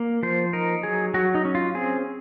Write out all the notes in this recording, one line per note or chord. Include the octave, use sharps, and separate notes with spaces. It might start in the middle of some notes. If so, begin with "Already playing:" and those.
Already playing: A#3
F3 C5
D#4 A#4
F#3 G#4
F#3 F#4
D#4
C#4
F4
C4 G#4